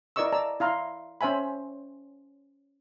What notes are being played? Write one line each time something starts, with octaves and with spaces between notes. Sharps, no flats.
E4 A#4 D5 D#5 C#6 E6
D5 A5 A#5 E6
E4 F5 A#5 C6
C#4 C5 E5 G#5 B5